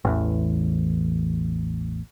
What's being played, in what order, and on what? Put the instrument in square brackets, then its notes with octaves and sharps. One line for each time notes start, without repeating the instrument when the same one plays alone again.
[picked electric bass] A1 E2